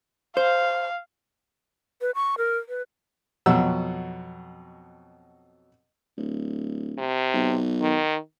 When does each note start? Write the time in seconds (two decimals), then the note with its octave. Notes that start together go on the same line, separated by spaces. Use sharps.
0.37 C5 F5
2.01 B4
2.15 C#6
2.38 A#4
2.69 B4
3.46 F2 B2 F#3 E6
6.17 D1
6.98 C3
7.33 B1
7.81 D#3